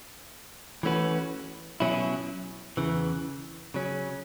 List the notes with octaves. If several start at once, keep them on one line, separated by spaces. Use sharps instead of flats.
E3 A3 C#4 F#4 B4
B2 F#3 C#4 E4
E2 C#3 E3
C#3 F#3 C#4